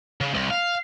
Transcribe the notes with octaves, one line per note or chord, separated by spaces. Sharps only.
C#3
C2
F5